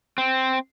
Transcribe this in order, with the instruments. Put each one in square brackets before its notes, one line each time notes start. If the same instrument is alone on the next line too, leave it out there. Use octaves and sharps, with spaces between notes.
[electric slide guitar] C4